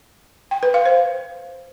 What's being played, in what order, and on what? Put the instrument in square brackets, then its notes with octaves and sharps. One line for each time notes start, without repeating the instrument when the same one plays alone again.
[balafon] G5
B4
F5
C5